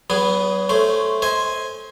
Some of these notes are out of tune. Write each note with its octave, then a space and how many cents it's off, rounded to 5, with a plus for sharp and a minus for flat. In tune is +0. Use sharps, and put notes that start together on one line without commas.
F#3 +40 B3 +0 G#4 +0
A3 +0 C#4 +0 C5 -15
C5 +0 D#5 +45 G#5 +0